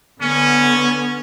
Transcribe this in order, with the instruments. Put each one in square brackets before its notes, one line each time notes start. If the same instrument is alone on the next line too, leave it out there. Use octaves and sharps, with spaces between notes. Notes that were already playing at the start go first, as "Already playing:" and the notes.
[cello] D3 B3 [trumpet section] C#4